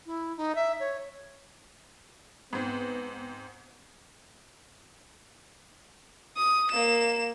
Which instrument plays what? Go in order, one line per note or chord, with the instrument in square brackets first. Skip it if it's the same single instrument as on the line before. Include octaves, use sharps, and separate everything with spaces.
[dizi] E4
D#4
E5
C#5
[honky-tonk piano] G#2 C4 [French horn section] B3
[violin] D#6
A#3 E7